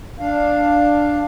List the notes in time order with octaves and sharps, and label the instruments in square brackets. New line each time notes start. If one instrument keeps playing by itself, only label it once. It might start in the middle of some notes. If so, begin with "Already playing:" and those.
[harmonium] D4 F5